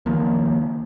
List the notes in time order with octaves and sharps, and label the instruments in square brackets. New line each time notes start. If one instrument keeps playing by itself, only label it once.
[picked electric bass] C#2 D#3 F3 A#3